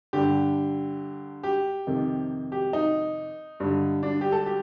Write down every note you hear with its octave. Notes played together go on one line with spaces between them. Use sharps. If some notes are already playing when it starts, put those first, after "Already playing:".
G2 D3 G4
G4
F2 C3 D#3
G4
D#4
G2 D3
D4
G4
A4
G4